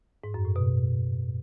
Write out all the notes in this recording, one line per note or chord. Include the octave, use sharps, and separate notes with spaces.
G#2
F#2
A2
B2